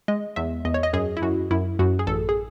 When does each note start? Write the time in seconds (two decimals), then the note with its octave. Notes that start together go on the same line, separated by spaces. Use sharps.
0.08 G#3 D#5
0.36 E2 E5
0.65 E2 D#5
0.74 C#5
0.83 D#5
0.93 F#2 G#4
1.17 E4
1.22 F#2 F#4
1.51 F#2 E4
1.79 F#2 F#4
1.99 G#4
2.07 A1 A4
2.29 G#4